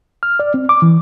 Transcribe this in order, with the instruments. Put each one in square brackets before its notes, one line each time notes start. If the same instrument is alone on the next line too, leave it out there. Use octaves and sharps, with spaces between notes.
[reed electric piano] F6
D5
C4
D6
E3